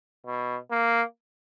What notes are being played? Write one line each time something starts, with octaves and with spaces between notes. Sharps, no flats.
B2
A#3